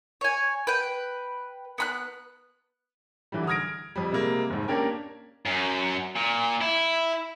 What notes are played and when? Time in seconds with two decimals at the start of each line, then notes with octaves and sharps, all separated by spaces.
0.21 C#5 G#5
0.67 B4 G5
1.78 B3 B5 F#6
3.32 D3 E3 F#3 G3
3.47 D#6 F6 G#6 A#6 D7
3.96 F2 G3
4.12 C3 G3 G#3 A#3
4.50 F1 G#2
4.68 A#3 C#4 D4 G4 A#4
5.46 F#2
6.16 A#2
6.61 E4